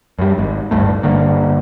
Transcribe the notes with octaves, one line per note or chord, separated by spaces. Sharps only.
F#2 G3
G#1 G#2
D1 G#1 G2 A3
G1 G2 D3 A#3